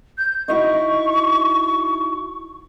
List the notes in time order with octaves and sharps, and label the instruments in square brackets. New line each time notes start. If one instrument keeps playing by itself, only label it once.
[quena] G6
[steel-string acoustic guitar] D#4 E4 F#4 [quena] C#6